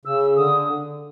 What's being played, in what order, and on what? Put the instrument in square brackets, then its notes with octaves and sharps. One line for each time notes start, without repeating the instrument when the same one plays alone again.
[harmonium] C#3 [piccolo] E6
[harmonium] D3 [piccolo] D#6